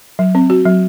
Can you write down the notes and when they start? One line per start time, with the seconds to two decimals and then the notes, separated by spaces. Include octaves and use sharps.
0.19 F#3
0.35 C4
0.50 F#4
0.65 F#3